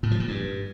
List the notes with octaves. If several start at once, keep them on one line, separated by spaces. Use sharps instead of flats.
A2
F3
A#2
G2